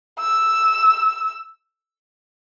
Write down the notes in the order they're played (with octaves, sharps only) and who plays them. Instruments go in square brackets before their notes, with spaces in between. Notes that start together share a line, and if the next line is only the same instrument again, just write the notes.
[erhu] E6